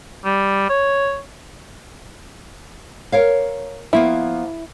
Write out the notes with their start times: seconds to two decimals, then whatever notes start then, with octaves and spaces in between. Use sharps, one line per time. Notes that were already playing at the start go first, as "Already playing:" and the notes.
0.25 G3
0.70 C#5
3.12 A#4 C#5 F5
3.93 F3 A#3 B3 E4